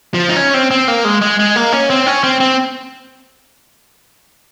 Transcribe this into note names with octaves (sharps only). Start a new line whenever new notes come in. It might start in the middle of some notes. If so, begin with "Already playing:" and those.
F3
D#4
C#4
C4
C4
A#3
G#3
G#3
G#3
A#3
C#4
C4
C#4
C4
C4